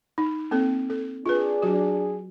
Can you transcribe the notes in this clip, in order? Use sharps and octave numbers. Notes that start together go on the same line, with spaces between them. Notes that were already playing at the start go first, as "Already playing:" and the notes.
D#4
A#3 C4 A4
A4
D4 F4 G#4 B4
F#3 F#4